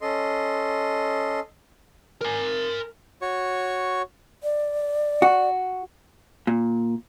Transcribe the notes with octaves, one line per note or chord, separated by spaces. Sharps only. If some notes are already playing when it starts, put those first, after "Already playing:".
C#4 A4 D#5 C6
A#4 G#5
F#4 C#5 C#6
D5
F#4
A#2